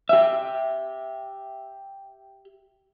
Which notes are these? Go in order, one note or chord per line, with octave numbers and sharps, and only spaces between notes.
G4 E5